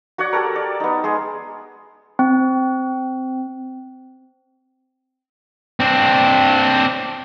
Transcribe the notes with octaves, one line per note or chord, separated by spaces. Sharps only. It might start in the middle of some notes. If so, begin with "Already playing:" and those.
F#4 C#5 D5 F#5
G4 A4 A#4
D5
B3 D#4
G#3 G#4
C4
C4 D4